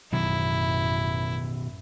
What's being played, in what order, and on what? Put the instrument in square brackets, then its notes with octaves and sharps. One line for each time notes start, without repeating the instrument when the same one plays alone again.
[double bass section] A1 F#2 [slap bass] B2 D#3 F#3 [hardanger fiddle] E4